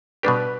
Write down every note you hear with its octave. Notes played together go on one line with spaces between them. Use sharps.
B2 G3 D4 G4 B4